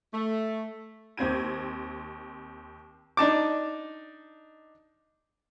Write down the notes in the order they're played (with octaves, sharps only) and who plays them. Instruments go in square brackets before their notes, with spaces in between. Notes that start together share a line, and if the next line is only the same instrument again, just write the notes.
[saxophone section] A3
[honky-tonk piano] D#2 C4 G#6 D#7
[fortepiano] D4 D#4 A5 D6